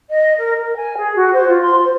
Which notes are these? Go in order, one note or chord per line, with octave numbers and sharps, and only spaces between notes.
D#5
A#4
A#4
G#5
G#4
F#4
C5
F4
C6
C5